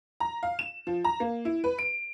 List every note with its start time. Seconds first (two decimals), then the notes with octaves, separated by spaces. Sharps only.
0.20 A#5
0.43 F5
0.59 E7
0.87 F3
1.04 A#5
1.20 A#3
1.45 E4
1.64 B4
1.79 D7